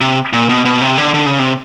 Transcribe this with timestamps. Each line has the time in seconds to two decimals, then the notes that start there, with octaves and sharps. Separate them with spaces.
0.01 C3
0.33 A#2
0.49 B2
0.65 B2
0.81 C3
0.98 D3
1.14 D3
1.26 C#3
1.39 C3